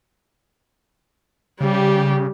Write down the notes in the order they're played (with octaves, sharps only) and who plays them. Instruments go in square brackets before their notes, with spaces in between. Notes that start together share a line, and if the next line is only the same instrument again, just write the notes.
[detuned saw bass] C#3 [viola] G3 G4